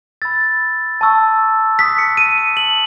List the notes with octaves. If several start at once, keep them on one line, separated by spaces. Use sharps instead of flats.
B5 E6 A6
A5 C#6 E6
A5 D#6 F#6 B6
C#7
D#7
D#7
A5 E6 F#7